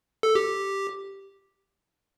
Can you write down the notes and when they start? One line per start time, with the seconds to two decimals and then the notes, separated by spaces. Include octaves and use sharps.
0.23 A4
0.35 G4